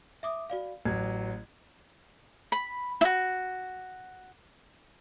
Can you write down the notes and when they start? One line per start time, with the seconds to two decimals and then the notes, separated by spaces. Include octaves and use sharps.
0.23 E5 D6 D#6
0.50 F#4 D5 F5
0.85 A1 F#3 G#6
2.52 B5
3.01 E4 F#4